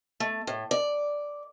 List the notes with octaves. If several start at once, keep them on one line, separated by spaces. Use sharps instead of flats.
A3
A2
D5